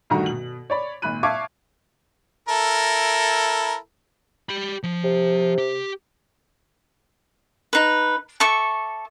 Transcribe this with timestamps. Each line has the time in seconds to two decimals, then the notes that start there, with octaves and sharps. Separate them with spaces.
0.10 D2 G2 D#3 F#4 A#5
0.26 B2 F#7
0.70 C#5 D5 B5
1.02 G#1 A#2 B5 F#6 D#7
1.23 E5 F5 A5 C#6 D6 G#6
2.49 E4 A4 A#4
4.49 G4 B5
4.83 F3
5.04 C3
5.58 G4
7.73 D#4 B4
8.40 A4 E5 C#6 D6